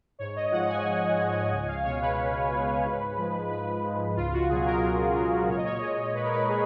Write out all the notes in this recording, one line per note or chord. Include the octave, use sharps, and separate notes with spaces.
G#2 C#5
D#5
F3 G#3 F#5
G#5
G#2
F3 G#3
C#2 G#5
F5
B2 G#3 C#5
B4
C#2
B2 G#3
G#2
F3 G#3
G#2 B4
F3 G#3
C#2 F4
F#4
B2 F#3 G#4
A#4
C#2 A#4
G#4
B2 F#3 A#4
A#2 C#5
D#5
C#5
G#3 D#5
A#2 B4
A#4
B4
G#3 G#4